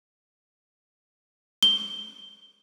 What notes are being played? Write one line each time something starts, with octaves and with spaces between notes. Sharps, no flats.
G7